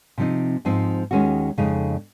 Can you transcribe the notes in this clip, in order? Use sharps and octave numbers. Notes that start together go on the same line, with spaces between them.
C3 F3 C4 D#4
G#2 F3 C4 D#4
D#2 D#3 G#3 C#4 F#4
F2 C#3 G#3 D#4